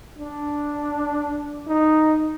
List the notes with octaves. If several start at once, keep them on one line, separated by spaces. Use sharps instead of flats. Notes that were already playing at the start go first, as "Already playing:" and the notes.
D4
D#4